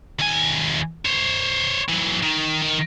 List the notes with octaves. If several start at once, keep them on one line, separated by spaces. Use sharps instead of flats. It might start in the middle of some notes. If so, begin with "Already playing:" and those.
D#2 G#5
C5 C#5
E3 F#3
D#3
D#3